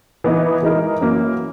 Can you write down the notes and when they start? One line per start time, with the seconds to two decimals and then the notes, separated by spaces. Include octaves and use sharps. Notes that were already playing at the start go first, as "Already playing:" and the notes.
0.24 E3 B3 D#4
0.62 E3 G#3 D#4 A#4
1.01 F#2 E3 A#3